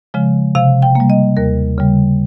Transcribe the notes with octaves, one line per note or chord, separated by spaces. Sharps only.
C#3 F3 G#3
C3 F5
G5
G3 A#3
D#5
D#2 A#4
C#3 G3